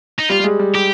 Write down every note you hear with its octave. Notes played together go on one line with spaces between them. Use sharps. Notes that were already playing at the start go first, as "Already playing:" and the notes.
D#4
G3 F4
G3
G#3
G3
G3 G4